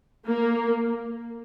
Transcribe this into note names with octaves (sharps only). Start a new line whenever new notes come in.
A#3